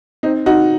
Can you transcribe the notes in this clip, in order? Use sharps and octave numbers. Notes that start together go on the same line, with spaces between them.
C4 D#4
D#4 F#4